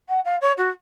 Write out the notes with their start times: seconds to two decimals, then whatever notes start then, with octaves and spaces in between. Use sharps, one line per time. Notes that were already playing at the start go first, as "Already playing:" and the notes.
0.08 F#5
0.25 F5
0.41 C#5
0.57 F#4